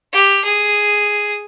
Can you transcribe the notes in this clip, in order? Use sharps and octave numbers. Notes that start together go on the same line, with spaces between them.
G4
G#4